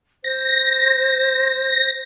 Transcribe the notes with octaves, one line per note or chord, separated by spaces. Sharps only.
C5 A#6